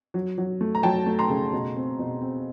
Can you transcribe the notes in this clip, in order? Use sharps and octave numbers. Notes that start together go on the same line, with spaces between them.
F#3
F#3
A3
A#5
F#3 G5 A5
A3
A#5 C6
C#3
B2
C4
B2
C4